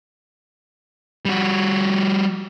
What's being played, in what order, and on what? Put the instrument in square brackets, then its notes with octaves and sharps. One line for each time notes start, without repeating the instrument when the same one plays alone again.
[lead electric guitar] G3 F#4